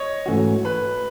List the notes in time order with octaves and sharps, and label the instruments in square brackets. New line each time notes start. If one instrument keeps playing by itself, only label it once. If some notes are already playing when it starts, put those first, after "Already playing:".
Already playing: [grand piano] C#5 D#5
[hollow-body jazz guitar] G#2 E3 A3 C#4 F#4
[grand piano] B4